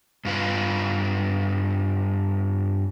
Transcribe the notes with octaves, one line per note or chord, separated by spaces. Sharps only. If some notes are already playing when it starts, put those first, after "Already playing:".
G2 F4 B4